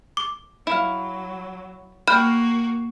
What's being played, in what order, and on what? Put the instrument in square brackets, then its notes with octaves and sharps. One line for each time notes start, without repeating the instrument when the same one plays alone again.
[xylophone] D6
[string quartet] F#3 [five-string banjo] E4 F5
[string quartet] A#3 F#4 A#4 [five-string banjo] G5 [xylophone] B5 F6 F#6